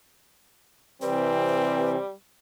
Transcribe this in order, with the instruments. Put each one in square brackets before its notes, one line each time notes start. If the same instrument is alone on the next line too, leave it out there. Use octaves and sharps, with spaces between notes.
[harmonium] C3 E3 [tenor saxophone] G3 [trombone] C4 [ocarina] B4